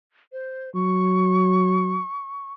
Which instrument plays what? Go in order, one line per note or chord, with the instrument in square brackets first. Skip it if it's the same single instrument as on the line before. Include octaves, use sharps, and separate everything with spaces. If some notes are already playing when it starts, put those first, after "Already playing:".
[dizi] C5
[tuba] F#3 [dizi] C#6